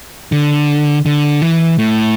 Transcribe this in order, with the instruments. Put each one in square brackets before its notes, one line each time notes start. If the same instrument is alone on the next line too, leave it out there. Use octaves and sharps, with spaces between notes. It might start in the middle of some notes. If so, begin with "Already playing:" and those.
[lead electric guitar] D3
D3
E3
A2